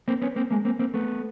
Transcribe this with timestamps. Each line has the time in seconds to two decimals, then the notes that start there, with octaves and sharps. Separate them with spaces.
0.08 A#3 C4
0.22 B3 C#4
0.36 A#3 C4
0.51 G#3 A#3
0.65 A#3 C4
0.79 A#3 C4
0.94 A3 B3